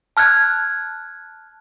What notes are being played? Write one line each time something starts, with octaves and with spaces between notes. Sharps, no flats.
A5 F6 F#6 G#6